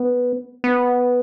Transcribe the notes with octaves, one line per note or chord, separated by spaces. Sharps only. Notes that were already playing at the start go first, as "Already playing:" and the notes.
Already playing: B3
B3